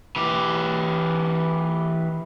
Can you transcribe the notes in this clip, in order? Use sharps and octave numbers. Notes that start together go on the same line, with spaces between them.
E3 G4